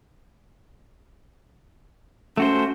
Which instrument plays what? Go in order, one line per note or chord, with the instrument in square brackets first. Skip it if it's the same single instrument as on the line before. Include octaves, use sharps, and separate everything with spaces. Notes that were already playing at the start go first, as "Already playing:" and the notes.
[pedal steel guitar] A3 F#4 C5 [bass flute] C#4